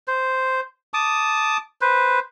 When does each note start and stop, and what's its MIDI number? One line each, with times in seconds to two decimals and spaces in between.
0.08 0.60 72
0.94 1.57 81
0.94 1.57 86
0.94 1.57 87
1.81 2.19 71
1.81 2.19 72